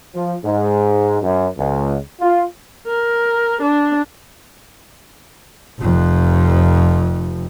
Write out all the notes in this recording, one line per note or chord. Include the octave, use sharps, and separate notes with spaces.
F3
G#2
F#2
C#2
F4
A#4
D4
F1 F2